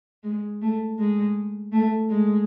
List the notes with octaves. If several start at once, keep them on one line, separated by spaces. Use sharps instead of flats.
G#3
A3
G#3
A3
G#3